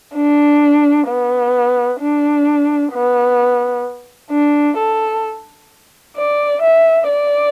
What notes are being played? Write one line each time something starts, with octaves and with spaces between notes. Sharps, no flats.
D4
B3
D4
B3
D4
A4
D5
E5
D5